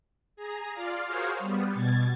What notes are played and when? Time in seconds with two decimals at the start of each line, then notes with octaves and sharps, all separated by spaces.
0.36 G#4 A#5
0.73 F4 D5 F5
1.04 F#4 G#4 A#4 C5 C#5 F5
1.39 G3 B3
1.72 B2 G#6 A6